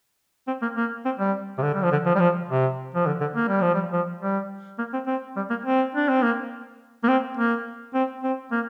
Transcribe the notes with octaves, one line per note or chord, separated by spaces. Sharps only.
C4
A#3
A#3
C4
G3
C3
D3
G3
F3
D3
F3
G3
F3
C3
F3
D3
D3
A#3
G3
F3
G3
F3
G3
A#3
C4
C4
G3
A#3
C4
D4
C4
A#3
A#3
C4
A#3
C4
C4
A#3